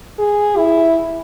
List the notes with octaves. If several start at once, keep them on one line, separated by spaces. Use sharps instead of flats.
G#4
E4